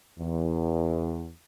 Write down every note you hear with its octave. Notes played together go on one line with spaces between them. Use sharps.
E2